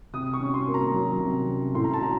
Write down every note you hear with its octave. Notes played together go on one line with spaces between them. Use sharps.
C3 D#6
C#6
C#4
C6
A#3
A#5
F#3
C3
C#4
A2 C6
A#5
A5
A2 A#5